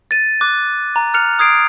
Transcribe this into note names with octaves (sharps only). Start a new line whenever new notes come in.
A6 D#7
D6 F#6
A#5
F6 F#6 C#7 F7
D#6 G#6 C7 D7